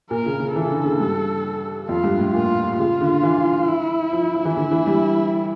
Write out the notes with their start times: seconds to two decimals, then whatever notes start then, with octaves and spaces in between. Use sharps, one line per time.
0.11 A#2 A#4
0.26 C#3
0.40 C#3
0.55 E3 A4
0.65 C#3
0.71 D3
0.86 C#3
1.00 G2
1.89 F2 F4
2.04 G2
2.19 A2
2.34 A#2 F4
2.78 C#3 F4
3.01 D3
3.23 E3
3.68 E4
4.13 F3
4.34 F3
4.45 E3
4.57 D3 E4
4.71 E3
4.87 G3